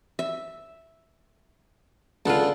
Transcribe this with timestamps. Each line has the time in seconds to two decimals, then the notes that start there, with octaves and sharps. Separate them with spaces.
0.19 E5
2.26 C#2 D3 F4 A4